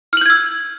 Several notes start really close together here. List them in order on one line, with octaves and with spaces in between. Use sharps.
F6 F#7 G6 G#6 E6